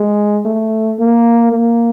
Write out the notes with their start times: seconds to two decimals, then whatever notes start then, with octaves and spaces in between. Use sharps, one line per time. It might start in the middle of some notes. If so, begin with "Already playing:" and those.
Already playing: G#3
0.45 A3
1.00 A#3
1.52 A#3